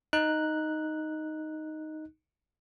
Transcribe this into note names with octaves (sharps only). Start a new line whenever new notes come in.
D#4 F#6